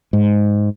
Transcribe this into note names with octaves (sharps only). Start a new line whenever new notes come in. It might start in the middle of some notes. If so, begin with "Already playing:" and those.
G#2